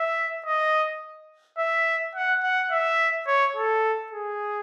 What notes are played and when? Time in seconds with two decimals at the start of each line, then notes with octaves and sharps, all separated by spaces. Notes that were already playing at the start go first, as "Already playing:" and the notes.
Already playing: E5
0.46 D#5
1.58 E5
2.15 F#5
2.43 F#5
2.72 E5
3.27 C#5
3.56 A4
4.12 G#4